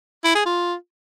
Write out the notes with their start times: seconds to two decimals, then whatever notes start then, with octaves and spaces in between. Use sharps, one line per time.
0.25 E4
0.35 G#4
0.46 F4